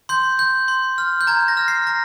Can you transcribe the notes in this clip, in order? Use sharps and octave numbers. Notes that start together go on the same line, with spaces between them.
C6 G6
G6
C6
F6
G6
A#5 G#6
A#6
F6
C7
A#5 A#6